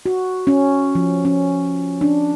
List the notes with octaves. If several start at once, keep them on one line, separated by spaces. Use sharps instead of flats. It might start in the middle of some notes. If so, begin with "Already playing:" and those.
F#4
C#4
F3
C#4
D4